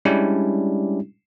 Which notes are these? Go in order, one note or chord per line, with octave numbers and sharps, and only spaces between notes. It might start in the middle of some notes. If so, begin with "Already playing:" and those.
G3 G#3 C#4 D4 E4 G4